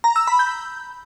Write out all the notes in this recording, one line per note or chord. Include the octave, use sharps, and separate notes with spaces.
A#5
E6
B5
G6